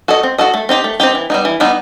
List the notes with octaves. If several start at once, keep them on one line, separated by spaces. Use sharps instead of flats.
F#4 A4 D#5
C4
F#4 A4 D#5
A3
C4 D#4 G4
A3
C4 D#4 G4
E3
G3 B3 D#4
E3
G3 B3 D#4